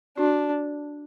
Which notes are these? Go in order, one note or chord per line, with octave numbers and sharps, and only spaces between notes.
D4 F#4